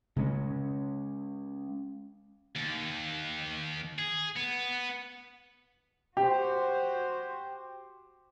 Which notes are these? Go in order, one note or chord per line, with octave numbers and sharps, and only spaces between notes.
C#3 G#3 C#4
D#2
G#4
B3
F#4 G4 C5